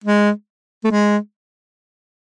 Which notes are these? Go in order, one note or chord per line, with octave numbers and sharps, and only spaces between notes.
G#3
A3
G#3